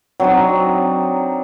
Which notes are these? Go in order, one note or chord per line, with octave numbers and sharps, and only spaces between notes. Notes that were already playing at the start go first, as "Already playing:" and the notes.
F#3 C4 D4 D#4